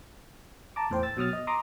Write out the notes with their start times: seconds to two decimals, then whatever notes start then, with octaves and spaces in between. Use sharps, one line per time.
0.76 A5 A#5 D6
0.90 E2 A2 C5 G5
1.03 E6 A6
1.17 B2 F#3 D#6 F6 A6
1.33 D#5
1.47 A#5 C6 D6 D#6